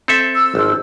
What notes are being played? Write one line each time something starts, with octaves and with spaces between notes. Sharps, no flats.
C4 A4 E5
E6
G#1 F3